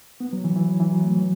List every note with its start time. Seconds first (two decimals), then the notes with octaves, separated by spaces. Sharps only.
0.20 B3
0.33 F#3
0.44 E3
0.56 E3
0.68 F#3
0.80 E3
0.92 F#3
1.04 A3
1.16 F#3